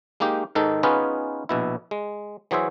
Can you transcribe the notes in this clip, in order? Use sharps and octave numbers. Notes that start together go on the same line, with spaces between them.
G#3 A#3 D#4 G4
G#2 D#3 D#4 A4
B3 C#4 D#4 F4 G#4 B4
A#1 B2 E4
G#3
E3 F#3 G#4 C5 E5